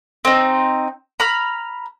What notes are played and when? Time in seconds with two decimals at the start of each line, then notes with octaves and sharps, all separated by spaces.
0.25 C4 D#4
1.20 A#5 B5 F6